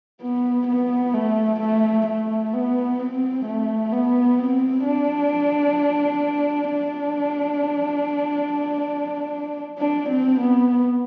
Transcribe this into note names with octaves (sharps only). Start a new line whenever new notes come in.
B3
B3
A3
A3
A3
B3
C4
A3
B3
C4
D4
D4
D4
C4
B3